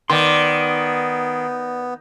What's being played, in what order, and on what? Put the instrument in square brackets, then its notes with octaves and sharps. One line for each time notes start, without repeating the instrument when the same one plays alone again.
[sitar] D#3 [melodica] B3 [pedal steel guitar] D5 C6